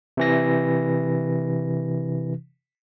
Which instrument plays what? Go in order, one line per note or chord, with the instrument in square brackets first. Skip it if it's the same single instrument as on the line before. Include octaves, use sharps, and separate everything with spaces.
[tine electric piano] C3 E3 A#6